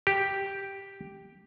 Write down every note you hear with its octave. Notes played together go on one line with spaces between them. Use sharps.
G4